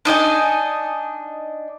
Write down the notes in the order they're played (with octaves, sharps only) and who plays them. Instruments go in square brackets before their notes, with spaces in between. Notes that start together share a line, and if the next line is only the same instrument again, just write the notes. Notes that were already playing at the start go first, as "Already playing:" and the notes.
[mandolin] D4 D#4 D#5 G#5